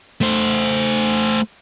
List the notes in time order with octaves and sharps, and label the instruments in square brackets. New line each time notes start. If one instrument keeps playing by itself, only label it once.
[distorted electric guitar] A3 C5